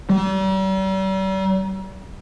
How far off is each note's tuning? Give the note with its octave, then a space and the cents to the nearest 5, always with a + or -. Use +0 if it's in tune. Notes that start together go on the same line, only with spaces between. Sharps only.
G3 -40